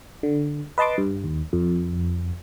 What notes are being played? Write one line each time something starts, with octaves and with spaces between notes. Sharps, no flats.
D3
B4 D#5 A5 C6 D6
G2
D#2
F2